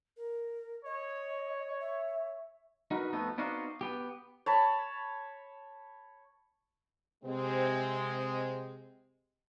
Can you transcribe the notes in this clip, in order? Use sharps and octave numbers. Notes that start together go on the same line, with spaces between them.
A#4
C#5 D#5
E5
D#4 F#4 A#4 B4
F2 A3 B3 D#4
B3 C4 D#4 F#4 D5 F5
B3 G4
C#5 A5 B5
C3 G#3 C4